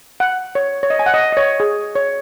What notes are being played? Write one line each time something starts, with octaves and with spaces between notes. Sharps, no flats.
F#5
C#5
C#5
D#5
G#5
F#5
D#5
D#5
C#5
G#4
C#5